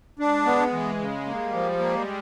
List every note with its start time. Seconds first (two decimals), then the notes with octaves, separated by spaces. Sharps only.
0.19 G#3 D4
0.46 B3
0.73 E3
0.99 C#3
1.26 G3 A#3
1.53 F3
1.79 G#3 A#3